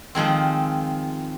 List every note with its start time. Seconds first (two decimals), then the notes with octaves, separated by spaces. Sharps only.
0.15 D#3 F3 G#3 C4